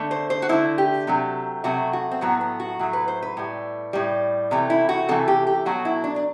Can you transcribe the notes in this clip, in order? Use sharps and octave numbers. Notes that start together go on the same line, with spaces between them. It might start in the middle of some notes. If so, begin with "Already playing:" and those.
Already playing: D3 A3
C5
C5
F#4
D3 A3 E4
G4
C3 F#3 A3
C3 F#3 A3 F#4
F#4
C4
A2 F#3 A3 B3
B3
F#4
A2 F#3 A3
B4
C5
B4
A2 G3
A2 G3
C3 E3 A3
E4
F#4
C3 E3 A3 A4
G4
G4
B2 F#3 A3 F#4
E4
D4
D4